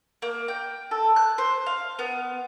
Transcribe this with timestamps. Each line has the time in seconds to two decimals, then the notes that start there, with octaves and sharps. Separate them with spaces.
0.22 A#3
0.48 G5
0.91 A4
1.16 F#6
1.38 C5
1.66 F5
1.99 B3